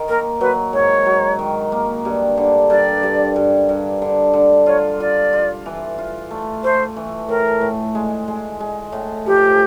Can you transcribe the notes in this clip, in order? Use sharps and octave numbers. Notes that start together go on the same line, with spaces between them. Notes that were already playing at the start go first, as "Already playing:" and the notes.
Already playing: D#3
A#3 A#4
F#3 B4
G#2 C#5
F#3
D#3
A#3
G2
D3
G2 D5
G2
G2
G2
D3
D3
F4 C#5
F4 D5
F4
E3
F4
A3
A3 C5
E3
A2 A#4
A2
G#3
G#3
G#3
A2
F3 G4